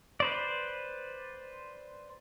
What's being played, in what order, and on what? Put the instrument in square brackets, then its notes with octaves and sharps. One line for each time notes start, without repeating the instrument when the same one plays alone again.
[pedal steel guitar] B4 C5 D5